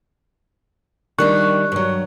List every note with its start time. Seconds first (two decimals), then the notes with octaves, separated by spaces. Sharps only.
1.18 D#3 G3 D4 C#6 F#6
1.72 G2 F#3